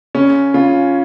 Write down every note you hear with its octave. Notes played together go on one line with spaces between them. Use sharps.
C#3 C#4
C#3 F4